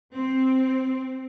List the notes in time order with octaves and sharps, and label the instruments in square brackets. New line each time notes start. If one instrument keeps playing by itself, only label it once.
[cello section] C4